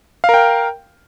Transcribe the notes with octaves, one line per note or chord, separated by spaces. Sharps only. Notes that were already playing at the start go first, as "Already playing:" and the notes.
A#4 F5 G5